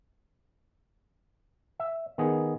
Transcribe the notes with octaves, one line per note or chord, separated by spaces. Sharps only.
E5
D#3 B3 G#4